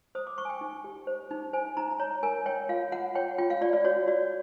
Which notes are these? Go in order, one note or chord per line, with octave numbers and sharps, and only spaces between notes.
C5 D#6
D6
C5 C#6
G#5
G5
D#4
G4
C5
D#4
C5 G#5
D#4 A#5
C#5 A#5
A#4 G#5
C#5 G5
F4 F5
F4 F#5
C#5 G5
F4 G5
F5
F4 D5
D5
F#4 C#5
F#4 D5